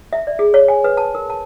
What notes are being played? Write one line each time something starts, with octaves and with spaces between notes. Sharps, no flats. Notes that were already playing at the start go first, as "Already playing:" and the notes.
E5
D5
G#4
C#5
G#5
B4
A5
A#4
A5